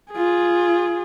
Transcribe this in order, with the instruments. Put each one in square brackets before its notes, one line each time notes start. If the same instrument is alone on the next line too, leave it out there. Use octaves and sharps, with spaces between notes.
[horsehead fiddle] F4 G#4